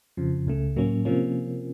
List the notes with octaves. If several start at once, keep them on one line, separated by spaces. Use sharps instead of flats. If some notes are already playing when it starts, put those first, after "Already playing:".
F2 C#3 F3
C#2 C#3 A3
A2 F#3 A#3 C#4
C3 F3 A#3 C#4